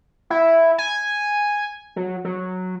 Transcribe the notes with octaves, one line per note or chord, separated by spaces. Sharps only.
E4
G#5
F#3
F#3